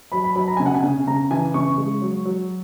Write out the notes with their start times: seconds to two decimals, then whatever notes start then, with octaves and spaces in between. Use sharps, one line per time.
0.12 F#3 B5
0.24 B5
0.35 F#3 B5
0.48 A#5
0.57 C#3 G#5
0.66 F#5
0.75 G#5
0.83 C#3
1.07 C#3 A#5
1.31 E3 G#5
1.54 C#3 C#6
1.78 G#3
2.02 F#3
2.25 F#3